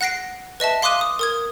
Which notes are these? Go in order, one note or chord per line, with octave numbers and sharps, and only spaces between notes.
F#5 F#6 A#6 C7 D7
B4 D#5 E5 A5
F5 C6 D6 D#6 F#6 D#7
D#6
A#4 D#6 G#6